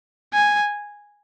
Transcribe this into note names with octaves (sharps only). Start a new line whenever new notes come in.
G#5